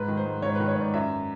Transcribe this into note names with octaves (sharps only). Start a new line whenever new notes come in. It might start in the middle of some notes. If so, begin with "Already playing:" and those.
Already playing: G#2 B4
D#3
C5
G#2
G#2 C#5
B4
D#3
C#5
G#2 D5
F#2 E5